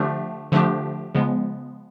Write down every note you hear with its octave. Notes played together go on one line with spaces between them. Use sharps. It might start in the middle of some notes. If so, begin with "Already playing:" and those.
Already playing: D3 F3 A3 D4 G4
D3 F3 A3 D4 G4
C#3 F3 G#3 B3